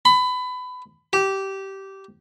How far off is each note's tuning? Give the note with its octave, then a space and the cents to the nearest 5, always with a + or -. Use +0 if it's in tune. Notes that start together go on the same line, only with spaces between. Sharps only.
B5 +25
G4 -15